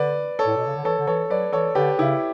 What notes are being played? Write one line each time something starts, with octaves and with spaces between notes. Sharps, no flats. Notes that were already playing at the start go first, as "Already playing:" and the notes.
Already playing: D3 B4 D5
A4 C#5
A2
B2
C#3
D3
E3 A4 C#5
D3
E3 A4 C#5
F#3 B4 D5
E3 A4 C#5
D3 G4 B4
C#3 E4 G4